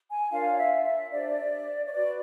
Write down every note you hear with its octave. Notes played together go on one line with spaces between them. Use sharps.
G#5
D4 F4 A#4 C#5 F5
E5
E5
D4 G4 C5 D5
C#5
F#4 B4 D5